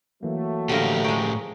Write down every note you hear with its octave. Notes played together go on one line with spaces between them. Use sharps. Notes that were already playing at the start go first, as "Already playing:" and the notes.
E3 F#3 A3 A#3
A2 D3 F3 G4 A#4
G#3 G5 A#5 C#6